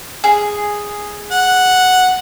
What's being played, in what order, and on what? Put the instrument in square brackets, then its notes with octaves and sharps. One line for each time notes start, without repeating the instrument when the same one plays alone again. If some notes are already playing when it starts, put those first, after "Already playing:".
[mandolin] G#4
[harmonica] F#5